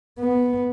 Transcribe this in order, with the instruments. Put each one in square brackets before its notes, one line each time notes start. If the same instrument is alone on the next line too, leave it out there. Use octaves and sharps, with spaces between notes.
[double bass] B3